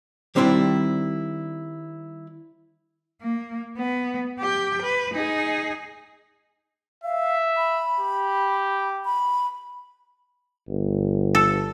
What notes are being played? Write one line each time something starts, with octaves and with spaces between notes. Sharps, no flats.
D#3 G3 C4 D4 E4 G4
A#3
B3
G4 G5
B4
D#4 G#4
E5 F5
B5
G4
B5
G1
A4